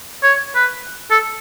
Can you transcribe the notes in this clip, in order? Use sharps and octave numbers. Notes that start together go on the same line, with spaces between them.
C#5
B4
A4